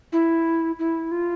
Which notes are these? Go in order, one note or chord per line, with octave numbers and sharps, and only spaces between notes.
E4
E4
F4